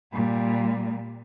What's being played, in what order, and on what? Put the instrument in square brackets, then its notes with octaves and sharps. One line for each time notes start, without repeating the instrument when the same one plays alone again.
[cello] A#2 G3